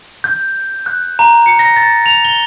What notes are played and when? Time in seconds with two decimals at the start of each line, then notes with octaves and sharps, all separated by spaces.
0.24 G6
0.86 F#6
1.19 A#5
1.46 C#7
1.59 A#6
1.76 A6
2.06 F7
2.25 G7